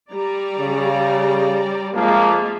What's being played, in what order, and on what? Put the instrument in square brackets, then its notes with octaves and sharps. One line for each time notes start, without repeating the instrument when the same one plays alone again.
[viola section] G3 D5 A#5
[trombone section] C#3
[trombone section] F2 F3 A#3 [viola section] G#3 F4 E5